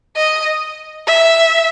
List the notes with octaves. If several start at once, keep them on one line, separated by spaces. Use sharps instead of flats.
D#5
E5